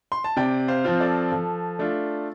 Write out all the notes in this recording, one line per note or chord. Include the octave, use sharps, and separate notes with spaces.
C6
A5
C3 D5 G5
C5 F5
F3 C4 F4
A4 D5
F3 A4
A3 D4 F4